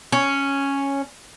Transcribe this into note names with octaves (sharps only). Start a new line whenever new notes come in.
C#4